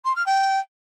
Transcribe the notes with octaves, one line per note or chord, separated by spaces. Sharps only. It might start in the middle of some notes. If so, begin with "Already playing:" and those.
C6
F6
G5